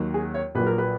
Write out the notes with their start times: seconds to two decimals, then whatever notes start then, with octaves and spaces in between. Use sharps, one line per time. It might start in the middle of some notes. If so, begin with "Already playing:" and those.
Already playing: D#2 D#3 F#3
0.14 G#4
0.34 C#5
0.55 A#1 A#2 F#3 B4
0.67 A#4
0.78 B4